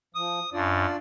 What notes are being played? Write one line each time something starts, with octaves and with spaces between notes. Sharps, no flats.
F3 D#6
F#2 D4 F4 D5